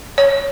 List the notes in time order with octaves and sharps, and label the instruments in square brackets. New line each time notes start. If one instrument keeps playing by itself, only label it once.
[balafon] C#5